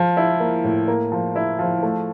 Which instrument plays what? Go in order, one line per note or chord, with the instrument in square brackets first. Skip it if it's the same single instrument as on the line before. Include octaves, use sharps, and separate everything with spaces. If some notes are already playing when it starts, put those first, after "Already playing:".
Already playing: [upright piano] F3
E4
A#3
A2
A#3
F3
E4
F3
A3